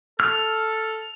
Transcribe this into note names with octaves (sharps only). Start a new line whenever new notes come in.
A4 F6